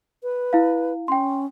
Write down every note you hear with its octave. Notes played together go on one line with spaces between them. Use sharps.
B4
E4 F5
C#4 G5 C6